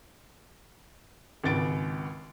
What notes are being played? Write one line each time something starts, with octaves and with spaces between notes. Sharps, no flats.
G#1 C#2 A6 D7